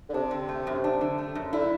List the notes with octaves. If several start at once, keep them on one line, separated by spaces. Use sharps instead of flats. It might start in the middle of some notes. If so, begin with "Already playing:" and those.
D3
C3 D4
D3
A3
F#2
D4
D3
A3
F#2
D3 E4